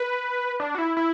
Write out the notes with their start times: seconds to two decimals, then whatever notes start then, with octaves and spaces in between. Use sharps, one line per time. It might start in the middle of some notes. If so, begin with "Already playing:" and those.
Already playing: B4
0.60 D4
0.75 F#4
0.78 E4
0.97 E4